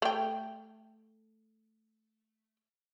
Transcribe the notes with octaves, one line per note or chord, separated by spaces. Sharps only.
A3 G5